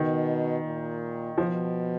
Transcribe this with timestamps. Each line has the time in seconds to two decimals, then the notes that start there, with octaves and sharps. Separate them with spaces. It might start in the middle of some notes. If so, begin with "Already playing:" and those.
Already playing: B2 D#3
0.65 A#2
1.38 B2 F3